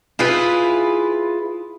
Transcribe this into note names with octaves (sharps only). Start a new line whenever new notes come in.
E4 F4 G#4 B4